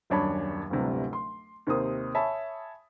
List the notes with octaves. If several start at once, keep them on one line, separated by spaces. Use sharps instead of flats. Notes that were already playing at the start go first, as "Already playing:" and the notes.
D#1 F#2 D4 C#5 A5 B5
D1 G1 C3 G3
C6
D#2 C3 A#4 C5 D#6
C#5 E5 G#5 A5 B5